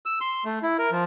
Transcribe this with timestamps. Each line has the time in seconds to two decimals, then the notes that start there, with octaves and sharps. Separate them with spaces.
0.06 E6
0.21 C6
0.45 A3
0.63 E4
0.79 A#4
0.92 F3